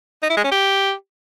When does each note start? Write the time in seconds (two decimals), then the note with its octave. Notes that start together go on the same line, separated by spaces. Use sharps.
0.22 D#4
0.30 E4
0.37 G#3
0.44 C#4
0.51 G4